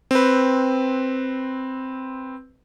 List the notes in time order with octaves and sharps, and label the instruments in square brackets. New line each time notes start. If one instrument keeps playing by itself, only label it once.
[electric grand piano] C4 B4